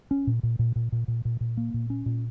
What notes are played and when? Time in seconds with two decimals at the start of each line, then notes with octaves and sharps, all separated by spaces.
0.11 C#4
0.27 A#2
0.43 A#2
0.59 A#2
0.76 A#2
0.92 A#2
1.08 A#2
1.25 A#2
1.41 A#2
1.57 A#3
1.74 A#2
1.90 C#4
2.06 A#2